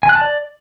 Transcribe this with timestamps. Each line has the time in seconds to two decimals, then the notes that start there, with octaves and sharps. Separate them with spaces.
0.03 G#5
0.09 F#6
0.15 A5
0.21 D5